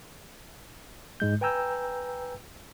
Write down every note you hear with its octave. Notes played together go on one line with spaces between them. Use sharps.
G#2 G#3 G6
B4 G5 G#5 A#5 E6 G6